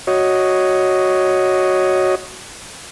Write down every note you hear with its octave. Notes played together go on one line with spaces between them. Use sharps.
F#4 C#5 D#5